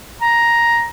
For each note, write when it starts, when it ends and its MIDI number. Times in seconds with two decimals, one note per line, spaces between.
0.22 0.86 82